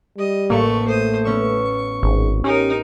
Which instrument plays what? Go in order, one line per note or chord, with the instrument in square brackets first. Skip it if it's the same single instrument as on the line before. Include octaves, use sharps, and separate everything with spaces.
[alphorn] G3 [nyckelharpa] D#5
[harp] A1 [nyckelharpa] A3 C#6 [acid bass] A#3
[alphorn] A3 [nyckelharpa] C5 D#6
[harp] B3 C#4 E6 [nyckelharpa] C#6
[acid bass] G#1 [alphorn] G#2
[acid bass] C#4 [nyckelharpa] D#4 A#4 [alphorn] G4